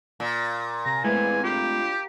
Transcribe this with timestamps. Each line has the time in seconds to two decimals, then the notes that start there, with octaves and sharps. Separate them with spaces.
0.20 A#2
0.85 C3 G#5 A#5
1.04 G#3 A3 C4 E4 G#4 B4 G#5
1.44 D4 F4 G4